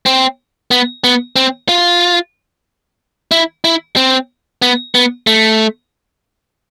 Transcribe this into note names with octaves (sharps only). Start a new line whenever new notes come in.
C4
B3
B3
C4
F4
E4
E4
C4
B3
B3
A3